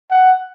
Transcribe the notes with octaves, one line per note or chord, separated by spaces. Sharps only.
F#5